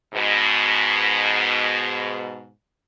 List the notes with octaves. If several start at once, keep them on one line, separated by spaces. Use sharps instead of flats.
G#2 B2